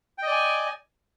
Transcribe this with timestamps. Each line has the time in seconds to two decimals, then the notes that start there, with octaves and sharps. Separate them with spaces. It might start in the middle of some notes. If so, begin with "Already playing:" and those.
0.18 G5
0.23 D#5
0.27 D5
0.32 G#5